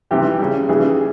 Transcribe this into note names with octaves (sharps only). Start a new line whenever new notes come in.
C3 E3 G3 G4
C#3 G3
C#3 E3 G3 G#4